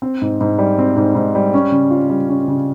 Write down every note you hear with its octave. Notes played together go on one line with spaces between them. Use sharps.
C4
G#2
G#2
G3
C4
G#2
G#2
G3
C#4
C#3
F4
G3
C#4
C#3